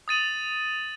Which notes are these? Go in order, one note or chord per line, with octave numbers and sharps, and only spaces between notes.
D#6 A6 D#7 F#7